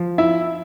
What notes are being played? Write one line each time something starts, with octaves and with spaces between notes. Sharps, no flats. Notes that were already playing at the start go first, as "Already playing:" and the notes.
Already playing: F3
E4 E5